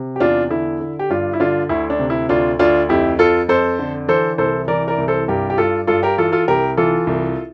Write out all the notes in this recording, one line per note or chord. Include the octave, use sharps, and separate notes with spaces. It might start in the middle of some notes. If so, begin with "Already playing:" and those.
Already playing: C3
G4
E2 D4 F4
D3 E4
D3
G4
G2 D4 F4
E4
D3 D4 F4
D2 E4
D4
C3
E4
D2 D4 F4
D2 D4 F4
F2 E4 G4
F2 F4 A4
F2 A4 C5
D3
E3 A4 C5
C2 A4 C5
E3 A#4 D5
A#4 D5
C2
A4 C5
G2 G4 A#4
G4
G2 F4 A4
G2 F4 A4
G4 A#4
E3 F4 A4
F4 A4
C2 G4 A#4
E3 F4 A4
C2